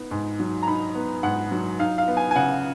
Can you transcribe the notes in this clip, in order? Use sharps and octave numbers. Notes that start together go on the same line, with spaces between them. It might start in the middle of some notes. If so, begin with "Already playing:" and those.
Already playing: B3 D#4
G#2
F#3
A#5
D#4 B5
B3
G#2 F#5
F#3
D#4 F5
F5
B3
G#5
G#5
C#3 F#5